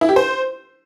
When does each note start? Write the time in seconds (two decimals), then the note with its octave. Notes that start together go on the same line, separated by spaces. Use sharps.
0.01 E4
0.09 G4
0.16 C5